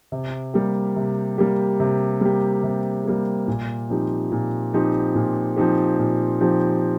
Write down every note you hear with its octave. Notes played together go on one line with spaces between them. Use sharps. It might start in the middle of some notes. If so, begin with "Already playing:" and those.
C3
G3 A#3 G4
C3
G3 A#3 G4
C3
G3 A#3 G4
C3
G3 A#3 G4
A#2
F3 C4 D#4 G4
A#2
F3 C4 D#4 G4
A#2
F3 C4 D#4 G4
A#2
F3 C4 D#4 G4